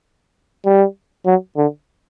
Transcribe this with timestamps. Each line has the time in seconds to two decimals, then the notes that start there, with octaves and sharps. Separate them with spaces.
0.66 G3
1.26 F#3
1.57 D3